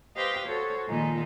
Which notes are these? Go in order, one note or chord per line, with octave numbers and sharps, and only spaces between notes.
G4 B4 C5 D#5 F5 G5
F#4 A4 C5 C#5
A#2 D#3 F3 G#3 D#4